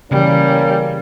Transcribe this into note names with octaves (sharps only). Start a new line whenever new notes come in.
C#3 E3 G3 A#3 C#4